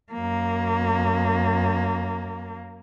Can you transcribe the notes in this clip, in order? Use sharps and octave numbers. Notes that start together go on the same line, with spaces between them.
F#2 A#3